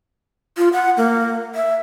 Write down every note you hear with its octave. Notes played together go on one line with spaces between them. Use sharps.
F4
F#5
A#3
E5